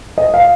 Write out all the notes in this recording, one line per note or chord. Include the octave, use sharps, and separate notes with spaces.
D#5
F5